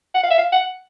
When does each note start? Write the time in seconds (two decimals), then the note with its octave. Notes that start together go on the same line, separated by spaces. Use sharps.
0.15 F#5
0.23 F5
0.31 E5
0.38 F5
0.53 F#5